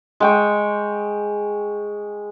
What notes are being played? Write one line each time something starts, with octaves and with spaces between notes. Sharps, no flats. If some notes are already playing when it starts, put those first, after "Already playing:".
G#3 G5 C#6